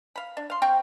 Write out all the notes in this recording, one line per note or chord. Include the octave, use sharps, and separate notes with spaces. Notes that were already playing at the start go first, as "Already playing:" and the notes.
F5 B5
D4
F5 C6
C4 F5 G5 C#6